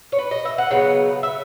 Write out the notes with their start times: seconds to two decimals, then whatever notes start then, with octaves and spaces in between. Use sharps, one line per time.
0.12 C#5
0.19 B4
0.31 D#5
0.45 E5
0.58 F#5
0.71 C#3 F#3 B3
1.23 E5